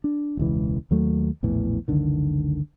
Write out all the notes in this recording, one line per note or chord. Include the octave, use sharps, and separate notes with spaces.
D4
E1 C#2 E3
D#2 F#3 A3
A#1 E2 A2 E3
F#1 C#2 D3 D#3